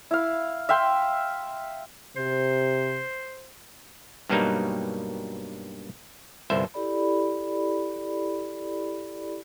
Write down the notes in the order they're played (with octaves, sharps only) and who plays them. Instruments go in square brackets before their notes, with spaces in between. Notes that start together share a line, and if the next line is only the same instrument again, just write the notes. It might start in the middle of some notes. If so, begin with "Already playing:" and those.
[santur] E4 F5
E5 F5 G5 C6
[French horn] C3 [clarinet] C5
[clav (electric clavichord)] G2 B2 F#3 G3 A#3 D#4
G1 C2 C5 E5
[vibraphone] E4 G4 A4 D5 B5